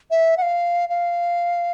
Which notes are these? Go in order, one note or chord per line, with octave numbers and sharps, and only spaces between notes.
E5
F#5
F5
F5